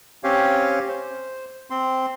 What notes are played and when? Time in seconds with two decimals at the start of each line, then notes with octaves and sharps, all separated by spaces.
0.24 C4 C#4 G4 C#5 F5
0.89 C5
1.70 C4 C6